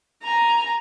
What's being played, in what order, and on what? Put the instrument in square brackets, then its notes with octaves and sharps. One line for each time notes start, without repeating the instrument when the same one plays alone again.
[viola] G#5 A#5